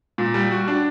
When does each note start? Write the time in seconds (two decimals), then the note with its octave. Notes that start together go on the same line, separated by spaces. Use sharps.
0.18 A#2
0.34 G3
0.51 F#4
0.68 D4